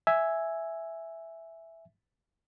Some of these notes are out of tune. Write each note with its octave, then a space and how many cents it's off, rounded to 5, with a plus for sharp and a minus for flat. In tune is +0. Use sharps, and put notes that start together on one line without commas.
E5 +0 G#5 +0